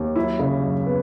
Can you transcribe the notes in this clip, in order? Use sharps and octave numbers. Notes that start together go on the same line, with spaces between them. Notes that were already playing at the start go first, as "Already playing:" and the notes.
Already playing: D#2
F#3 E4
C#3
F#2
B3